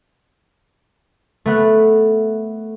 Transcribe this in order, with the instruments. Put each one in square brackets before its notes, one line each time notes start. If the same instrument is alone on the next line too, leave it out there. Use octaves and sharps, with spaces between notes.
[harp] A3 B3 F#6